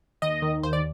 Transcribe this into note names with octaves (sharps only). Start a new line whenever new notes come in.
D#2 D#5
D#3
D#2 C5
D5